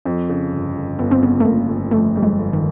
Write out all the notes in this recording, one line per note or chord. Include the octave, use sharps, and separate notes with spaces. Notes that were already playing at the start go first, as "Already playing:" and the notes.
F2 C4
C#3
G1
G1
G1 B3
C4
C#3 B3
A3
G1 A#3
G1
F2 A3
F2 G3
G#3
G1
D#3